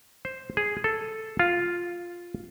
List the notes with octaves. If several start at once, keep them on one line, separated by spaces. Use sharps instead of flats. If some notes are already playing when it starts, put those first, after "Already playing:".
C5
G#4
A4
F4